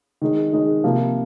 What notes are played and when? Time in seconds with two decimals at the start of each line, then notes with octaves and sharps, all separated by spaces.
0.22 D#3 G#3 D#4
0.53 D#3 G#3 D#4
0.84 C3 F3 A#3